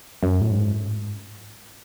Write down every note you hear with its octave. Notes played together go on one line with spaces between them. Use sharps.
F#2
A2
G#2